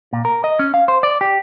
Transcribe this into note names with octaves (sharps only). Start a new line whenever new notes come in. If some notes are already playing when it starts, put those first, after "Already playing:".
A#2
A#4
D#5
C#4
F5
C5
D5
G4